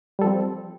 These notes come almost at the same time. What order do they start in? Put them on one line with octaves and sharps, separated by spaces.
G3 A4 F3 C4